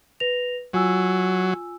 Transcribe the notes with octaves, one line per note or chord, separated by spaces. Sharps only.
B4 A#6 F7
F#3 F4 G#5 E6